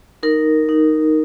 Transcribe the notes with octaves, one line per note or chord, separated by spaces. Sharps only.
D#4 A#4
D#4